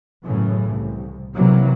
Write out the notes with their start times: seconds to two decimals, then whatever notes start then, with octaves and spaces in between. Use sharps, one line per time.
0.25 F#2 A2 C#3 E3
0.73 C2
1.35 C3 E3 F#3 A#3